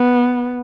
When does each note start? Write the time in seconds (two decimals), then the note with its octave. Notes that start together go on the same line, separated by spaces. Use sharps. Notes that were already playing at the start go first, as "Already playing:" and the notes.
Already playing: B3